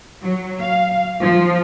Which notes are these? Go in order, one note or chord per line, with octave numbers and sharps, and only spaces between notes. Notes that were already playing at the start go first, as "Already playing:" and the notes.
F#3
F5
F3